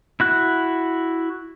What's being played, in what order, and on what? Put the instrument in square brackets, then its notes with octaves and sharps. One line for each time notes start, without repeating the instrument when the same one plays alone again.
[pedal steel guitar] E4 F#4 F#6